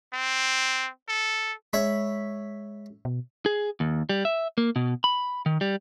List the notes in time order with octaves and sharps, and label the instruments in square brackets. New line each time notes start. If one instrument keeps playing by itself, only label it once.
[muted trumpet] C4
A4
[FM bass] G#3 [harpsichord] C#5 E5 B5
[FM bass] B2
[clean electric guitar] G#4
D#2
G3
E5
A#3
B2
B5
D#3
G3